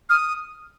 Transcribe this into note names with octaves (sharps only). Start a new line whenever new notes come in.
D#6 F6